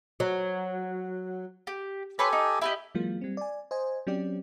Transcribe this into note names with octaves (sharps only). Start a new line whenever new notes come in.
F#3
G4
G4 A4 B4 C#5 G#5 C6
D#4
E4 G4 D#5
E3 F#3 G#3 A#3 F4
G3 C4
D5 G#5
C5 D#5 G#5
F#3 C4 C#4 G4 D5